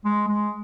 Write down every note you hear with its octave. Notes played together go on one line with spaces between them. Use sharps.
G#3
G#3